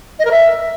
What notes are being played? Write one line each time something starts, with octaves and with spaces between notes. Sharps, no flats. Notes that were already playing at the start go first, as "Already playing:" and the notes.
D#5
A#4
E5